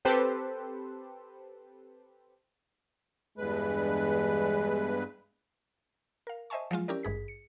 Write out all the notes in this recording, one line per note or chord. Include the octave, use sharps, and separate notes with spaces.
C4 G4 A4 B4 C5
E2 G2 G#3 B4
A#4 F5
C5 D#5 E5 G#5 A5 C#6
F3 F#3 G#3 F4
C#4 E4 G4 A#4 D5
G#1 G2 G#4 B6
C#7